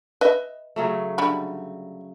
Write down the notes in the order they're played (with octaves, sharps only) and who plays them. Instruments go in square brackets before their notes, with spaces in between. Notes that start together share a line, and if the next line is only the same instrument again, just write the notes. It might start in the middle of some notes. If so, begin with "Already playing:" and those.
[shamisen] B4 D#5 E5
[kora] C#3 F#3 A3
[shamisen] D3 G3 B5